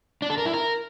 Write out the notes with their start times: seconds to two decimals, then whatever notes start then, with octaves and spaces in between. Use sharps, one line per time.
0.22 D4
0.30 A4
0.38 A#4
0.46 E4
0.53 A#4